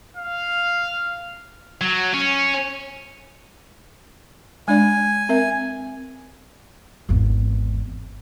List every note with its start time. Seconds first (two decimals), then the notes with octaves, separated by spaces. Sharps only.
0.17 F5
1.81 F#3
2.14 C#4
4.68 G#3 D4 D5 G#5
5.29 C4 A#4 E5
7.09 G#1 E2